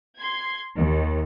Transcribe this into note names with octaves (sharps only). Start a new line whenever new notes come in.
C6 G#6
D#2